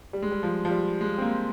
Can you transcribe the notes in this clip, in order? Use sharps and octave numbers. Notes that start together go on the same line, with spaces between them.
G3
G#3
G3
F3
F3
G3
G#3
C4
A#3